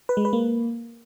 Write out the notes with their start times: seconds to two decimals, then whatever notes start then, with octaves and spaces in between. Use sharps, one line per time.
0.09 B4
0.17 G#3
0.25 B4
0.33 A#3